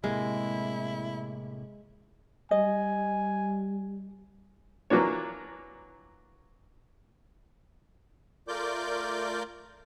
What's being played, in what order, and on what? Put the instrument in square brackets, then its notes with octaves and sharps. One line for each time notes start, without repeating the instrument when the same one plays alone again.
[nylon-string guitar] A2 C3 A#3 [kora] G#3 [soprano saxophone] E4
[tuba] G3 [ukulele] D#5 [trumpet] G#5
[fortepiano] E3 F#3 A#3 D4 C#5
[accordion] A3 F4 A#4 D5 D6 G6